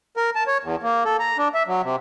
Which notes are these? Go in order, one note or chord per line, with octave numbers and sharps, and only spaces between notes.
A#4
A5
C#5
E2
A#3
A4
A#5
D4
E5
F#3
C3